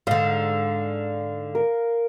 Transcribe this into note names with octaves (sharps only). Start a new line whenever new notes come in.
G#2 D3 F5
A#4